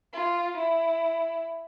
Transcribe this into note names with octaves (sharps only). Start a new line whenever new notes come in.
F4
E4